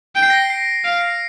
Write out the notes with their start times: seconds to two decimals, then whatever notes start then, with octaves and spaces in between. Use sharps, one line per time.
0.16 G5 D7
0.23 C7
0.30 A#6
0.38 C7
0.50 C7
0.84 F5 D7
1.01 C7